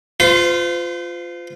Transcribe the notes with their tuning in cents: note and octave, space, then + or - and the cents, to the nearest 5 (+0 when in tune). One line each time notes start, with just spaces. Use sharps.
F4 +0 C5 -40